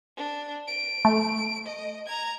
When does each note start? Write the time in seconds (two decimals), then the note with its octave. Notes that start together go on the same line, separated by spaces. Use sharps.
0.17 D4
0.68 D7
1.05 A3
1.66 D#5
2.06 A#5 G#6